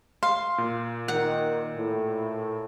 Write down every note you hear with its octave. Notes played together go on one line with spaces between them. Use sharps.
F5 C6
A#2
D#3 F#5
A2